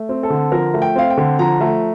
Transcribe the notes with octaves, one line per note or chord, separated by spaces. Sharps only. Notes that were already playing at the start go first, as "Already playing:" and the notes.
Already playing: A3
C4
A4
D3
F3 A#4
A3
G5
C4 F5
G5
D3
F3 A#5
A3